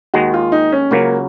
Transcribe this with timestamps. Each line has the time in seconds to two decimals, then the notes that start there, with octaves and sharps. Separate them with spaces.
0.14 D#2 D#3 G#3 F#4
0.34 F4
0.52 D#4
0.72 C#4
0.91 C#2 C#3 F#3 A#3